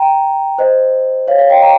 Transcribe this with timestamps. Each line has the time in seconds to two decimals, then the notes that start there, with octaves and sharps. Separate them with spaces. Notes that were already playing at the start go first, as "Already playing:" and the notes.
Already playing: G5 A#5
0.58 C5 D#5
1.27 C#5 F5
1.39 C#5 F5
1.50 D#5 G5
1.62 G5 A#5